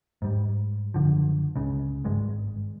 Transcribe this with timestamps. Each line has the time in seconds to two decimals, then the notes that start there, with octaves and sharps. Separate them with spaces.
0.22 G#2 G3
0.94 F#1 D2 D3 F3
1.56 C#2 C#3
2.04 G#1 G2 G#3